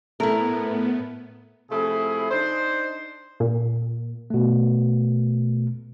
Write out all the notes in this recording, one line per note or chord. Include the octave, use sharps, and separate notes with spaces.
A2 A3 B3 E4 A#4
C3 F3 A3 E4 G#4
D4 D#4 C5
A#2
B2 A3